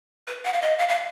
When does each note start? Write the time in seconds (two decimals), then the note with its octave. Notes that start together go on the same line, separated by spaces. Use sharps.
0.27 B4
0.45 F#5
0.53 F5
0.62 D#5
0.78 F5
0.89 F5